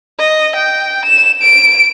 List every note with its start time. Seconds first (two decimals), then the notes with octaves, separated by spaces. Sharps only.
0.19 D#5
0.55 G5
1.05 E7
1.42 D7